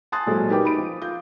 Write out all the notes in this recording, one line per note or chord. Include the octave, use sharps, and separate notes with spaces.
G#5 A5 C6 D#6 F#6 A6
A#1 F#3 G#3 A3
D#4 G4 A#4 B4 G5 D6
D#4 B5 D7
F3
F4 G6